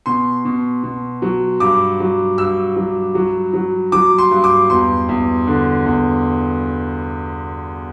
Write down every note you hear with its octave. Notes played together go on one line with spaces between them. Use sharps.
B2 C6
B2
B2
F#3
G2 D6
F#3
G2 E6
F#3
F#3
F#3
F#3 D6
C6
G2
D6
E2 C6
E2
D3
E2